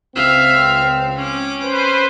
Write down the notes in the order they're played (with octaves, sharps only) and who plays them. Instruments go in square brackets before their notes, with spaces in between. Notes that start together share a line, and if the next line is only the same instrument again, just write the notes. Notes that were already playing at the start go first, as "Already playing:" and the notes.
[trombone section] C#2 C4 [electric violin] E5 F5
[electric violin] C#4 D6
[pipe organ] B4 C5